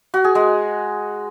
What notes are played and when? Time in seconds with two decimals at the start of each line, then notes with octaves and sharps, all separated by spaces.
0.14 F#4
0.24 G#4
0.35 G#3